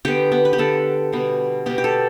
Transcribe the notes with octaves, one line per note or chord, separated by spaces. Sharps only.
D3 B3 G4
B3
B4
G4
D3 B3 A4
B2 G3 B3
B2 G3 B3 G4
G4
A4